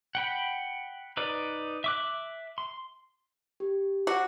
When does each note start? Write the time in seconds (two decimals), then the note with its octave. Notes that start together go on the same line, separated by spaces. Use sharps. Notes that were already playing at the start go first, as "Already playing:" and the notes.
0.15 F#5 G5 B5
1.17 D#4 B4 D5
1.84 E5 D6 F#6
2.58 C6
3.60 G4
4.07 F#4 F#5 D6